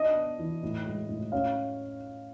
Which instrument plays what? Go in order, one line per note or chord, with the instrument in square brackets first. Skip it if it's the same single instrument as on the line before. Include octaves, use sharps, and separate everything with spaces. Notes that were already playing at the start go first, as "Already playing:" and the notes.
Already playing: [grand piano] D4 D#5
B3
E3
A2
G#3
A2
C#4 F5